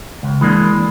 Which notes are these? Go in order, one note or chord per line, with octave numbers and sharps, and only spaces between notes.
C#2
E3 G#3 A#3 D4